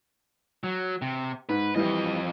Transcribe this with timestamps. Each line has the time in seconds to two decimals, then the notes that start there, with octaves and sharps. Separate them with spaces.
0.64 F#3
1.02 C3
1.49 G#2 B4
1.76 F2 E3 G3 D#5